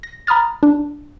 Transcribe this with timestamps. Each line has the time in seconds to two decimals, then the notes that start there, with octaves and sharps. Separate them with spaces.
0.03 A#6
0.27 A#5 B5 D#6 F6 A6
0.63 D4